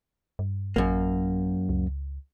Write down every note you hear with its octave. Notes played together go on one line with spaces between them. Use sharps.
G2
A1 F#2 A#3
C#2